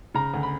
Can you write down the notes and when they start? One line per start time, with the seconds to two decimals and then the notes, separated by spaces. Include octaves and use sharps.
0.14 C#3 A#5
0.34 D2
0.43 B5